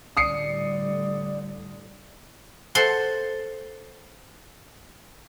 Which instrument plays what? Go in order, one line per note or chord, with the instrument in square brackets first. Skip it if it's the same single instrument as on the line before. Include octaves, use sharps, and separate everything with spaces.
[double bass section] A2 D3 G3 [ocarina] D5 [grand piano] D#6 C7 C#7
[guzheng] A4 C5 F#5 C6